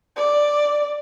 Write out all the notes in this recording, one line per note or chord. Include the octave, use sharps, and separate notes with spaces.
D5